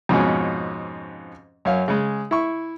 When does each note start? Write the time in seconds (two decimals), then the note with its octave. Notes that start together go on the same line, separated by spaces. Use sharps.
0.09 F2 G#2 B2 C#4
1.65 F#2 C#5 F5
1.88 C#3 G#3
2.31 E4 C#6